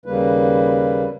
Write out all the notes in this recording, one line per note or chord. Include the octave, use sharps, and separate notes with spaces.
D#2 C#3 G3 A#3 B4